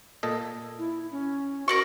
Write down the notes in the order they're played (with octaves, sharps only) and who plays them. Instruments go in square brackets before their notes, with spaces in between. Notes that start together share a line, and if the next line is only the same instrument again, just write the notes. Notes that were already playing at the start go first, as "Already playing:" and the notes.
[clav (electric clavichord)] A#2 A4 D#5
[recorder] E4
C#4
[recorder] F#4 [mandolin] A#4 D5 C#6